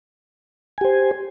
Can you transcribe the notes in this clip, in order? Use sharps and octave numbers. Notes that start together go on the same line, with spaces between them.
G4 C5 G#5